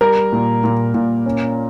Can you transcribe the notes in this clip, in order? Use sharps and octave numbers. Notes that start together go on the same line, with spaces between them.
G3 A#4
A#2
A#2
A#2
C#4